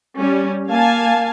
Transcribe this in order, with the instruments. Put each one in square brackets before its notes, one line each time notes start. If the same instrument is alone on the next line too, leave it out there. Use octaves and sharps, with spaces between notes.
[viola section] G3 C#4
A#3 F5 G#5 A5